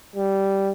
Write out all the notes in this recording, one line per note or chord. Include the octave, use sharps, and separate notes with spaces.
G3